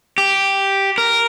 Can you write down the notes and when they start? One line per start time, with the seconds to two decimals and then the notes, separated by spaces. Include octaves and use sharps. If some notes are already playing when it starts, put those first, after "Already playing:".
0.18 G4
0.98 A#4